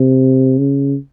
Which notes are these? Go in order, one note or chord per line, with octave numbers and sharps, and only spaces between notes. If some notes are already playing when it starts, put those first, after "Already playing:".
Already playing: C3
C#3